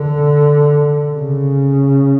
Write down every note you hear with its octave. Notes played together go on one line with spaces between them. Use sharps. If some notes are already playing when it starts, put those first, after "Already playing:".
Already playing: D3
C#3